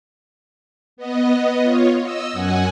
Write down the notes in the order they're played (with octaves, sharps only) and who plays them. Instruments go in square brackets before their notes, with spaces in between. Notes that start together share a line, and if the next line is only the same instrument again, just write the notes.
[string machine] B3 D#5
F4 C#5
D#5 E6
F#2 F#5 G#5